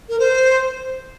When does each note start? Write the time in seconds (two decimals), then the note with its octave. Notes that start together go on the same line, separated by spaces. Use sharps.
0.09 A#4
0.19 C5